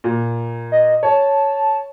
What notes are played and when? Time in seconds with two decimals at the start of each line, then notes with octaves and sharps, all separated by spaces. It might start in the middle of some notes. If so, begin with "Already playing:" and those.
0.04 A#2
0.72 D#5
1.03 C#5 A5